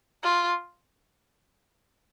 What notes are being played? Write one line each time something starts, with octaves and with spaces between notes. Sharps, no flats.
F4